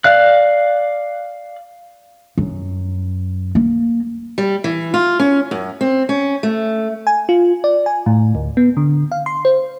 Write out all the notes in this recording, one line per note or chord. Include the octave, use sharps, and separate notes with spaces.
D5 F5 F#6
F#2
A#3
G3
E3
F4
C#4
F#2
C4
C#4
A3
G#5
F4
D5
G#5
A2
D2
B3
D3
F5
C6
C5